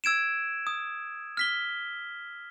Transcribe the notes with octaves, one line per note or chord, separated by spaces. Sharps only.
E6 G#6 D7 E7
D#6
F6 B6 G7